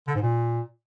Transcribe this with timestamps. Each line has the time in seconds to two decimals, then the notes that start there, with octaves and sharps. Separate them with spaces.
0.07 D3
0.15 G#2
0.22 A#2